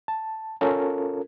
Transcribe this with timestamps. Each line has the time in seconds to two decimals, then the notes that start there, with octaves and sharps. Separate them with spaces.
0.08 A5
0.61 C#4 F4 A4 A#4